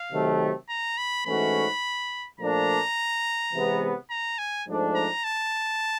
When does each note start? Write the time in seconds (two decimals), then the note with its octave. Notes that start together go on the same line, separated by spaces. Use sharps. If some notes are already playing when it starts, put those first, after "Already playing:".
Already playing: F5
0.12 C3 D#3 F#3 A3
0.69 A#5
0.98 B5
1.26 G#2 E3 A3 C#4 F#4 B5
2.40 A#2 F3 A3 D4 A#5
3.53 C3 E3 G#3 B3
4.10 A#5
4.38 G#5
4.67 G#2 F3 A3 D4
4.95 A#5
5.24 A5